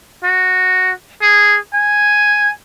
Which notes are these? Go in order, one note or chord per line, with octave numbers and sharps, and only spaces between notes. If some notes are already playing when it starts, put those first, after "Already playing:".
F#4
G#4
G#5